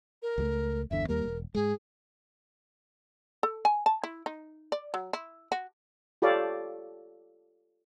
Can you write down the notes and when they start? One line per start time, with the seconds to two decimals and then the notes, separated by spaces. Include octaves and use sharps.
0.22 A#4
0.38 C#2 G3 A3
0.91 G1 E2 D3 E5
1.09 D#2 G3 A#3 A#4
1.25 E1
1.55 G#2 G#3 G#4
3.43 A4
3.65 G#5
3.86 A5
4.03 E4
4.26 D#4
4.72 D5
4.94 F#3
5.13 E4
5.52 F#4
6.22 F4 G4 A4 C#5 D5 F5